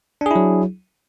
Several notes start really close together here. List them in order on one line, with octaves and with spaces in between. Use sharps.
D4 G#4 E4 F#3